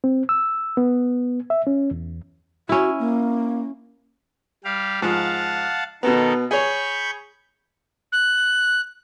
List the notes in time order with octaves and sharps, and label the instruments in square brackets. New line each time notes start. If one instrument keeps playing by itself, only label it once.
[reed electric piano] C4
E6
B3
E5
C#4
E2
[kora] C#4 E4 [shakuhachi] F#4
[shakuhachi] A#3
[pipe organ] G3 G4 F5
[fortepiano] G#2 F3 [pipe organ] F5 F#5 A5
[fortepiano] B2 B3 [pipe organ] D#3 A4 A#4
[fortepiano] G#4 C#5 [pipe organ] B5 C#6 G6
[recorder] F#6